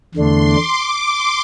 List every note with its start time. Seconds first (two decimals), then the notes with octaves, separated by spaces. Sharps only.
0.15 E2 D3 A3 D4 C6
0.44 D6
1.02 C6